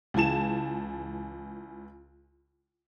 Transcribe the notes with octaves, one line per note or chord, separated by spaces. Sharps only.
C#2 E3 G#5 A5 E7